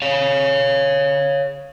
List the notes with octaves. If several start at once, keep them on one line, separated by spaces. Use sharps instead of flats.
C#5 F5